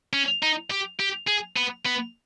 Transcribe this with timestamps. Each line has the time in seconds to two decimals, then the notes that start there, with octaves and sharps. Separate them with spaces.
0.13 C#4
0.42 D#4
0.70 G4
1.00 G4
1.28 G#4
1.57 B3
1.85 B3